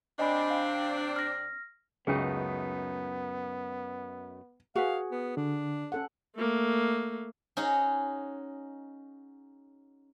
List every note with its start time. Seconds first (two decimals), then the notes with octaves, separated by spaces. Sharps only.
0.19 C3 C4 D4 D#5 G#5 B5
0.50 F5
1.16 F6 A#6
2.07 C#2 F#2 A3 B3 C#4 D#4 G#4
4.76 F#4 G#4 B4 F5
5.12 B3
5.37 D3 D4
5.92 C#4 A4 F#5
6.36 A3 A#3
7.57 C#4 D#4 F#4 G#4